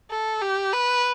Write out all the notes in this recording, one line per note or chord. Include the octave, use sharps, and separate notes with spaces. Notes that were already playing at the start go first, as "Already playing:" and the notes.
A4
G4
B4